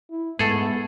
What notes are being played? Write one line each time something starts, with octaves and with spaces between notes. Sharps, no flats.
E4
G#2 A3 B3 G#4 A4